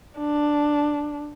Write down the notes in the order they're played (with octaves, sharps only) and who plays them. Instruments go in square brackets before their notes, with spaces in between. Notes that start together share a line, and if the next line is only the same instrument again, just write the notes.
[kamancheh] D4